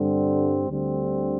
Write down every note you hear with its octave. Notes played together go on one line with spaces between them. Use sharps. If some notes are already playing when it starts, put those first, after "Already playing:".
Already playing: G2 D3 G3 C4
D2 D3 G3 C4